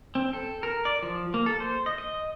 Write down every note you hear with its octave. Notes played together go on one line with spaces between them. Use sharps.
C4
A4
A#4
D5
F3
A#3
A4
C5
D#5
D#5